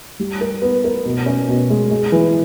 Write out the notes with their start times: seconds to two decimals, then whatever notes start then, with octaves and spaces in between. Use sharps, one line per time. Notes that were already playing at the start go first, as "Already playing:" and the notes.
0.19 G3
0.41 A#4
0.62 B3
0.84 A#4
1.05 B2
1.26 C#4
1.48 B2
1.70 G#3
1.91 G#3
2.12 E3